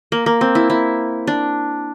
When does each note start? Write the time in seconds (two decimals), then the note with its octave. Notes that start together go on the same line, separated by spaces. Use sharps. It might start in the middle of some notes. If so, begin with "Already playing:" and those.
0.12 A#3
0.26 A#3
0.41 C4
0.55 E4
0.70 E4
1.27 D4